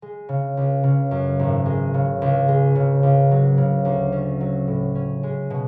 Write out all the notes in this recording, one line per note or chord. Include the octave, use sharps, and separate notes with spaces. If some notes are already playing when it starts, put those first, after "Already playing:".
G#3
C#3
C#2
C#3
F#2
G#1
G#3
C#3
C#2
G#3
C#3
C#2
F#3
C#3
D2
C#4
F#3
A2
C#4
G#3
B2